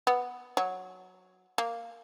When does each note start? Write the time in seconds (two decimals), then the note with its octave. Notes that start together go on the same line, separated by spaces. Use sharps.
0.07 B3
0.57 F#3
1.58 A#3